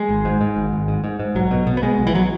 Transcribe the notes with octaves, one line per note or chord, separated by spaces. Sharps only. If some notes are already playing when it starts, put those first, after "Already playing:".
Already playing: G#3
G#1
G#2
G#2
G#1
G#1
G#2
G#2
G#2
B1 F#3
B2
B2
B3
B2 G#3
B1
E3
F#3